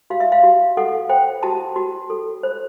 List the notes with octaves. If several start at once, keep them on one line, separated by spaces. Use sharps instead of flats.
F#4 F5
E5
F5
F#4
A4 F#5
C5 G5
F#4 A5
F#4
A4
C5